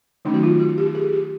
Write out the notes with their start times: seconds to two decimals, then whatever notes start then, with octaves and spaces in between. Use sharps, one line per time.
0.25 D#3 F#3 A3 C#4 D#4
0.34 F#4
0.43 F4
0.59 F#4
0.78 G4
0.95 G#4
1.13 G4